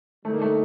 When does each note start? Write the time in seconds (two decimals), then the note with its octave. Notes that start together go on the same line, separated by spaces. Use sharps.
0.25 D3 G3 A3 C4 D#4
0.33 A#3
0.41 A3